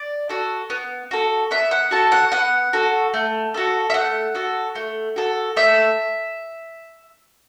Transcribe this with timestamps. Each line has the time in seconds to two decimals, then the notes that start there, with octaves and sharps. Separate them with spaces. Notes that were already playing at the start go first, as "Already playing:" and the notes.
Already playing: D5
0.29 F#4 A4
0.70 B3
1.11 F#4 A4
1.51 B3 E5
1.71 F#5
1.91 F#4 A4 A5
2.12 F#5
2.32 B3 F#5
2.73 F#4 A4
3.14 A3
3.54 F#4 A4
3.90 E5
3.94 A3 F#5
4.35 F#4 A4
4.75 A3
5.16 F#4 A4
5.57 A3 E5